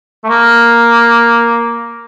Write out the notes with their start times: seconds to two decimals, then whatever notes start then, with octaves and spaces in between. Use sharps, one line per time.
0.24 A3
0.29 A#3